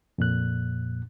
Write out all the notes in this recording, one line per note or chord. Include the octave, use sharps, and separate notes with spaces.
F2 A#2 F#6